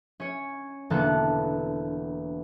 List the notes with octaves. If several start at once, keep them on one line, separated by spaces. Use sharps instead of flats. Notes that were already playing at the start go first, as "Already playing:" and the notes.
C#4 C#5
E1 D3 A#3 B3 A4 F#6